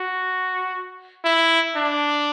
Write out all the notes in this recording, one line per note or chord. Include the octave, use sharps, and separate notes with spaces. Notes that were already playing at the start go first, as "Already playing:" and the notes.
Already playing: F#4
E4
D4